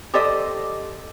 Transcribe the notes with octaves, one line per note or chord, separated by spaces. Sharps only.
G4 A4 C5 D5 D#5